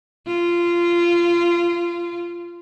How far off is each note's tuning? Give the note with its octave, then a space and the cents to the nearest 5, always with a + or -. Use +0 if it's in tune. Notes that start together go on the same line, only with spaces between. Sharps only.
F4 -20